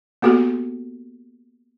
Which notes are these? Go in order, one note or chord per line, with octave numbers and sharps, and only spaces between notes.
A#3 B3 F#4 G4 A4